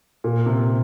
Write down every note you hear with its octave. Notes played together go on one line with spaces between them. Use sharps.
A#2
C3